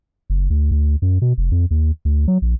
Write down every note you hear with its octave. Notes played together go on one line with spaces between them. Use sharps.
F#1
D2
D2
F#2
B2
F1
F2
D#2
D2
F#3
A#1